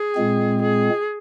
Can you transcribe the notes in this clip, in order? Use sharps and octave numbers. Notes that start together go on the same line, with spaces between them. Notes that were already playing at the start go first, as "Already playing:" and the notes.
Already playing: G#4
A#2 G#3 C4
G#4